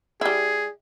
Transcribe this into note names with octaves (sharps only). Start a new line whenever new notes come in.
G3 E4 G#4